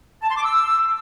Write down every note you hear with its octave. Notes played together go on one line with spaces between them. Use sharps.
A5
C6
D6
E6